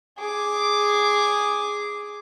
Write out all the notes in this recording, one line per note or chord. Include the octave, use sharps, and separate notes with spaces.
G#4 D6